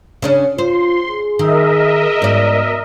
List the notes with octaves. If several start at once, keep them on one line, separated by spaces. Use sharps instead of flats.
C#3 C#4 D4
F4 C5 C6
G#4
D#3 A#4 D#5 E5
G#2 B2 D5